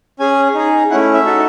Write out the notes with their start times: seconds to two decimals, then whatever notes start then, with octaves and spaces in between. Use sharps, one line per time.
0.20 C#4 G#4 G#5
0.55 D#4 G#4
0.90 A3 C#4 E4 F#5
1.14 E5
1.25 D#4 F#4 A4